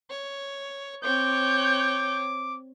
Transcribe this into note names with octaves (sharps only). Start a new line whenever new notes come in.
C#5
C4 C#5 D6 G6